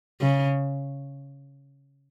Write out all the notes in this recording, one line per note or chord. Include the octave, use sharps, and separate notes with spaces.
C#3